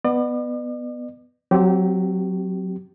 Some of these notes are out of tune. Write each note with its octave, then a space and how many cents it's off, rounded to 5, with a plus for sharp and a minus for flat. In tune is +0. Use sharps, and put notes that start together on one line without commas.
B3 +0 D5 +45
F#3 +0 C4 +0 G4 -25